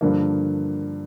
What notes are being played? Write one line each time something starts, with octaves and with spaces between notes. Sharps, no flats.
G2 D3 F3 A#3